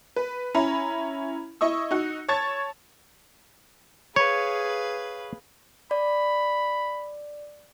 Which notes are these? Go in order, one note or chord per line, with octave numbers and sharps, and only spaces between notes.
B4
C#4 E4 A#5 B5
E4 D#5 C#6 E6
D#4 F#4
C#5 A5 C#6 G#6 A6
G#4 B4 C#5 F5
D5 B5